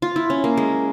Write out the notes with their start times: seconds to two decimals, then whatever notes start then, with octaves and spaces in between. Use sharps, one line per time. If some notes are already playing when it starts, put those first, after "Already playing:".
0.02 F4
0.16 E4
0.30 C#4
0.44 A#3
0.57 G#3